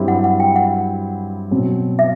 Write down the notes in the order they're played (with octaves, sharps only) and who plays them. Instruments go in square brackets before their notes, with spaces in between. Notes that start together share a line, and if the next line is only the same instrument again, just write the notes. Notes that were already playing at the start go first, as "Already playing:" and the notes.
Already playing: [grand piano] G2 F#3 C4 E4 G4
[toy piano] F#5
F#5
G5
F#5
[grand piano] B2 F#3 C4
[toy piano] E5